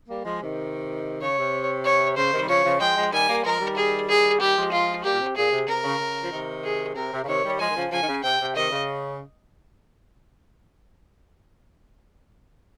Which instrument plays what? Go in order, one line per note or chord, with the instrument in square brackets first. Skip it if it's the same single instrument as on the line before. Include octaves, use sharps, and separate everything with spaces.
[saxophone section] G3 A#3
F3 G#3
C3 D#3
[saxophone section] C#3 [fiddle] C#5
[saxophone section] C3
[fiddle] C#5
[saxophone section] C#3 [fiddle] C5
[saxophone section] C3 D#3
G3
[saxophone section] C#3 F3 [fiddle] C#5
[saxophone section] C#3 F3
[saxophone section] F3 G#3 [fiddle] G5
[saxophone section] F3 G#3
[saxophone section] D#3 G3 [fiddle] G#5
[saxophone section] G3 A#3
[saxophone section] F3 G#3 [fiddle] A#4
[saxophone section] D#3 G3
[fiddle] G#4
G#4
[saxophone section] D#3 G3 [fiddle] G4
[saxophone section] F3 G#3
[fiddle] F4
[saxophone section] G3 A#3 [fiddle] G4
[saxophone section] A#2
C3
[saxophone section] A#2 [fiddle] G#4
[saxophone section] C3
[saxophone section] C3 [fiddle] A#4
[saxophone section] C#3
C#3
F3
C3 D#3
[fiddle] G#4
[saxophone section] C3 [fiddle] A#4
[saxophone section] C3
C#3
[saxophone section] C3 D#3 [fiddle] C#5
[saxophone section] D#3 G3
[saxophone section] F3 G#3 [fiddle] G#5
[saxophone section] D#3
C#3 F3
[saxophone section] C#3 F3 [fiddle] G#5
[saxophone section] D#3
C#3
[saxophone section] C3 [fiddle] G5
[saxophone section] C3
[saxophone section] C3 D#3 [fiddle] D#5
[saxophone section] C#3